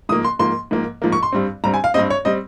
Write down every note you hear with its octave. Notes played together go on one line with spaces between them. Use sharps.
G#2 F3 A#3 D#6
C6
G#2 F3 A#3 C6
G#2 F3 A#3
G#2 F3 A#3
C#6
C6
G2 G3 C4
G2 G3 C4 A#5
G#5
F5
G2 G3 C4 D#5
C#5
G3 C4 D#5